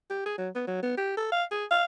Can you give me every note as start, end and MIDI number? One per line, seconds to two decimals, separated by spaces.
0.10 0.24 67
0.26 0.34 68
0.38 0.49 54
0.55 0.65 59
0.67 0.80 54
0.83 0.93 59
0.98 1.17 67
1.17 1.30 69
1.32 1.44 77
1.51 1.65 68
1.71 1.85 77